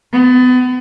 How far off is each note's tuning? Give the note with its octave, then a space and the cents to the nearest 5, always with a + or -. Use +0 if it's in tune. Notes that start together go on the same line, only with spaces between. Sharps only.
B3 +30